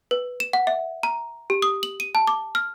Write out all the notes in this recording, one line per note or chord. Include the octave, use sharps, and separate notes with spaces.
B4
E7
F#5
E5
A#5
G4
D#6
F#7
D#7
A5
D6
F6